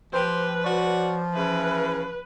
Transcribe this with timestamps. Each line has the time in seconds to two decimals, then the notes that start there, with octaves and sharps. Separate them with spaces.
0.13 F3 G4 B4 C5
0.64 F#4 C#5 D5
1.34 C#3 E3 E4 B4